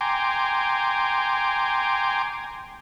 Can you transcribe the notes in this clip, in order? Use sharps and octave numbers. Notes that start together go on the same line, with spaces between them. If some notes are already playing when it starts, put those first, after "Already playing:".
G5 G#5 A#5 C6 D6